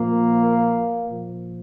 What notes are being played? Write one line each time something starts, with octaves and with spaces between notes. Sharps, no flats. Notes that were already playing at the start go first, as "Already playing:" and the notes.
Already playing: A#2 F3 A#3
A#2 F3